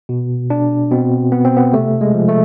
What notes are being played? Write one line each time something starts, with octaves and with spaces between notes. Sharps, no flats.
B2
D4
B2 C4
B3
C4
B3
C3 A3
G#3
F3
A3